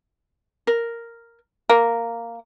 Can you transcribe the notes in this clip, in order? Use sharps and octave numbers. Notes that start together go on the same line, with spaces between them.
A#4
A#3 A#4